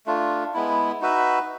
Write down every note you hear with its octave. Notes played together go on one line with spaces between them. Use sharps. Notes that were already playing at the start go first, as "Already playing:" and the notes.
A3 D4 F4
G#3 B3 E4
D#4 F#4 B4 E5